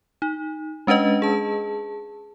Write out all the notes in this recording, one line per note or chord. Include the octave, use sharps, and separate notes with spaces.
D#4
G#3 C#4 D4 B4 D#5
G#4 A5